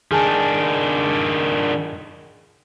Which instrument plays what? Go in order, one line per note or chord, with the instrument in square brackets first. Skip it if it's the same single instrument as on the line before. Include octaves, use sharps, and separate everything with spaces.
[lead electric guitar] D#3 D4 [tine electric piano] G#4 G#5 A5